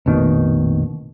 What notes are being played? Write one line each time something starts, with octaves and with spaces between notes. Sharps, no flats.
F1 A#1 B2 D#3